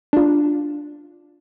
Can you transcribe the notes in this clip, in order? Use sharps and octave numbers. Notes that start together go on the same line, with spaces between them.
D4 F4